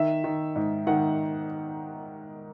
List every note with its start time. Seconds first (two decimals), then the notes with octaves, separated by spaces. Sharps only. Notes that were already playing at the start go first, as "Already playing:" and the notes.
Already playing: D#3 E5
0.24 D#3
0.56 G#2
0.87 D#3 F#5